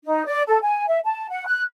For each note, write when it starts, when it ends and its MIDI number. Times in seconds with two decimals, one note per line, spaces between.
0.05 0.25 63
0.26 0.42 74
0.47 0.58 69
0.62 0.86 80
0.87 0.99 76
1.05 1.29 81
1.30 1.46 78
1.46 1.61 90